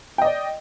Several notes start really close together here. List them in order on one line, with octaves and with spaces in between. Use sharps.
G5 D#5 D5